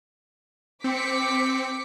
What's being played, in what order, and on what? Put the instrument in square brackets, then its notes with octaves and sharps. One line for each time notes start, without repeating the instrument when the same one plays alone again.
[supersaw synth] C4 [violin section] D6 B6 C#7